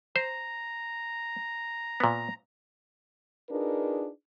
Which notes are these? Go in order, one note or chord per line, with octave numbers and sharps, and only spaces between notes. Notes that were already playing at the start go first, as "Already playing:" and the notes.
C5 A#5
A#2 B3
D4 D#4 F4 G#4 A#4 B4